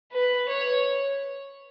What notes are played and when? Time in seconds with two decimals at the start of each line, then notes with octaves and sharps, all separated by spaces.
0.13 B4
0.49 C#5